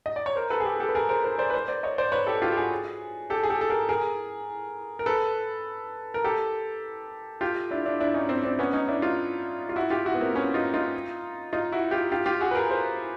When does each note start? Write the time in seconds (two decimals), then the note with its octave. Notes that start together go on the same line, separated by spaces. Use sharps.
0.06 D#5
0.16 D5
0.26 C#5
0.36 A#4 C5
0.50 A4 B4
0.60 G#4
0.65 G4 A4
0.80 G4 A4
0.89 B4
0.95 G#4 A#4
1.09 A#4 C5
1.24 A#4 C5
1.38 C5 D5
1.50 B4
1.54 A#4 C5
1.68 C5 D5
1.83 C#5 D#5
1.98 C5 D5
2.12 B4 C#5
2.27 G4 A4
2.42 F4 G4
2.52 G4
2.57 F#4 G#4
3.30 G4 A4
3.43 G#4
3.50 G4 A4
3.61 A4
3.70 G#4 A#4
3.89 G#4 A#4
4.99 A#4
5.06 A4 B4
6.14 A#4
6.24 G4 A4
7.41 F4 G4
7.71 D4 E4
7.85 D4 E4
8.00 D4 E4
8.14 C#4 D#4
8.29 C4 D4
8.44 C4 D4
8.59 B3 C#4
8.73 C#4 D#4
8.88 D4 E4
9.02 D#4 F4
9.69 F4
9.76 E4 F#4
9.90 F4 G4
10.05 E4 F#4
10.14 B3
10.20 A#3 C4
10.35 B3 C#4
10.54 D#4 F4
10.74 D#4 F4
11.53 D#4 F4
11.72 E4 F#4
11.91 F4 G4
12.12 F4 G4
12.26 F4 G4
12.41 F#4 G#4
12.51 B4
12.55 G#4 A#4
12.70 A#4 C5